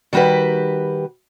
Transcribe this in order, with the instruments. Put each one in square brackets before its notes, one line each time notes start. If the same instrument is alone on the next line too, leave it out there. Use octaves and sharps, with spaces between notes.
[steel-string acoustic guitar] D#3 G3 F#4 G4 B4